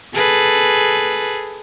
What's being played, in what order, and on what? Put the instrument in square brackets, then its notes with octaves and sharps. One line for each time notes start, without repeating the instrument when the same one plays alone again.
[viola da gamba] G#4 A4 B4